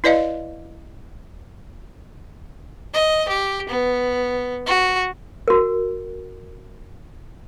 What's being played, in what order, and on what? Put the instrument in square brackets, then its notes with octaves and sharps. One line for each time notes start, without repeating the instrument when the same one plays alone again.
[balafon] E4 B4 D5 D#5 F5
[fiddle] D#5
G4
B3
F#4
[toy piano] F#4 A#4